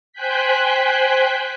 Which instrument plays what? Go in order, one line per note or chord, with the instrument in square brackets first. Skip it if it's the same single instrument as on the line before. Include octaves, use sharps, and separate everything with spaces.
[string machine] C5 G5 G#5 F#6 G6 B6